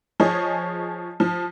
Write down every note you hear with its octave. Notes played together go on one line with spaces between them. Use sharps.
F3 G#4 C#5 D#5
F3